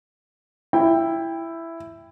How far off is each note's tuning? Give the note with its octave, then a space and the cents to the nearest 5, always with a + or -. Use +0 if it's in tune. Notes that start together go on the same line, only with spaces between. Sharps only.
E4 +10 G5 +20